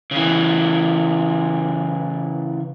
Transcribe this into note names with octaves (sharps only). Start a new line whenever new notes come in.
C#3 E3